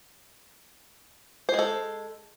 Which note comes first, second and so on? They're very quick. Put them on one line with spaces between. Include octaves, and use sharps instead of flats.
C5 G#3 A4